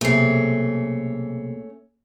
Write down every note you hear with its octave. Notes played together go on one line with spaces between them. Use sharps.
B1 C3 A3 A#3 C#4 G#4 C7